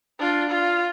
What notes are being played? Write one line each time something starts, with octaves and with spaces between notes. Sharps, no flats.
D4 F4
F4